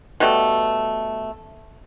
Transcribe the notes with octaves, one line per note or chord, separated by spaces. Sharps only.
B2 G3 A3